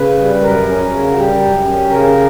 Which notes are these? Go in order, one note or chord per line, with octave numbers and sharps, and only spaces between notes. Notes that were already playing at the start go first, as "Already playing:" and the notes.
Already playing: C#3 B4
G3
F#2 A#4
C#4
C#3
F#4
G3 G4
F#2
C#4
C#3 A#4